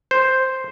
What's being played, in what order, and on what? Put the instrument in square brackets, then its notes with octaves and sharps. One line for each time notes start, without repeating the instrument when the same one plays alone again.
[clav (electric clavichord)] C5